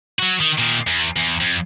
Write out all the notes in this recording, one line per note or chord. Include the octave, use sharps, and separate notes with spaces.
F#3 F#4
D#3
A#2 D#3
E2
E2
F2